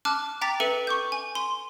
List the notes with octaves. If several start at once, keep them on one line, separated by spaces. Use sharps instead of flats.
A5 D6 F6 F#6
G5 A#5 D6 A6 B6 F7
A4 B4 E5 C#7 D#7
C#6 D6 G6
G#5
C6